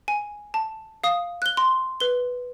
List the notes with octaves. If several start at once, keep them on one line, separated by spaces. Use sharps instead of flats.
G#5
A5
F5 D#6
F#6 G7
C6
B4 G7